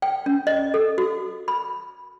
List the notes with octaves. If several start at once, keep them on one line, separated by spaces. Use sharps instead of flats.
G5
C#4
D#5
A4
F#4
B5